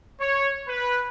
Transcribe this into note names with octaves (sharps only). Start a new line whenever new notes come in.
C#5
B4